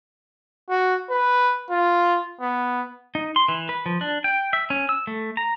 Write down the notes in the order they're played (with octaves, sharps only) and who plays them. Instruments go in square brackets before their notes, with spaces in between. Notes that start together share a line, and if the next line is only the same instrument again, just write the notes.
[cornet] F#4
B4
F4
B3
[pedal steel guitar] D#4
C6
E3
B4
F3
D4
G5
E5
C#4
E6
A3
A#5